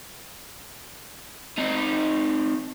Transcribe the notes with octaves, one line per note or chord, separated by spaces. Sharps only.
C4 D#4